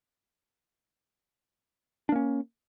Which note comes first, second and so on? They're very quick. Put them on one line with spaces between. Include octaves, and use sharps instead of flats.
D4 A#3 C#4